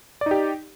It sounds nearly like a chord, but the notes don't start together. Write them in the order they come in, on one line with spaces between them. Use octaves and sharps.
D5 D#4 G4